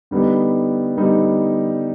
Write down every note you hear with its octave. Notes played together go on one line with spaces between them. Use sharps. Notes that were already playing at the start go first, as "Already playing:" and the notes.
D3 G3 B3 D#4
D3 G3 B3 D#4